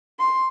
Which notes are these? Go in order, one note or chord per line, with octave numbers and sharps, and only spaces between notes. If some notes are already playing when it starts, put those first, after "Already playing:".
C6